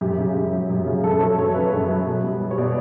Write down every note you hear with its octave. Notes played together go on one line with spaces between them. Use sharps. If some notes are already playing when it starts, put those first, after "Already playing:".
F#2 G4
C#3
F#2
F#3
F#2
C#3
F#2 A4
F#3 C#5
F#2 C#5
C#3 B4
F#2
F#3
B2
G3
G3
C#5
B2 D5